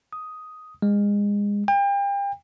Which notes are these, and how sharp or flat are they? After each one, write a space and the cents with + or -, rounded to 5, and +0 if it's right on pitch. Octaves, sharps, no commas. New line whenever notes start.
D#6 +5
G#3 -25
G5 +35